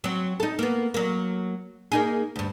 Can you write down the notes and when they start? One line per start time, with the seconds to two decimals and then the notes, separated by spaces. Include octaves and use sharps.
0.04 F#3 C4
0.40 D#4 A4
0.59 A#3 B3
0.94 F#3 A#3
1.92 A#3 D#4 G#4
2.36 D2 G2